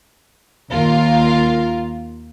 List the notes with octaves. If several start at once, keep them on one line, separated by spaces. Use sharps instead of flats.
D#2 F4 A#4